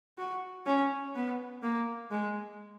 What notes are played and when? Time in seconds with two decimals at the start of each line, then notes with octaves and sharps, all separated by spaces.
0.18 F#4
0.66 C#4
1.15 B3
1.62 A#3
2.11 G#3